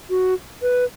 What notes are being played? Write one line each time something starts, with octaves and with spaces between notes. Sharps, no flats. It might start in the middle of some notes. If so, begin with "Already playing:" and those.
F#4
B4